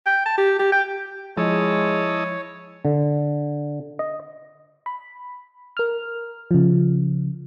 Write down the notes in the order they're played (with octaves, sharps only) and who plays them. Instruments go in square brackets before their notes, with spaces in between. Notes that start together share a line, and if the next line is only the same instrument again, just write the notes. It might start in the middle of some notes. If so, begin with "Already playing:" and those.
[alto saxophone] G5
A5
G4
G4
G5
[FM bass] F3 [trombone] G#3 [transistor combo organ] E4 D#5 A5 [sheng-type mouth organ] C#5
[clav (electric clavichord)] D3
D#5
[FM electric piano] B5
A#4 F6
C#3 F3